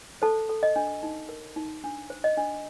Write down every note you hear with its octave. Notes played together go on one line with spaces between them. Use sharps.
A4 C5 A5
A4
D#5
D4
D#4
A#4
D#4
D4
C5
D#5
D4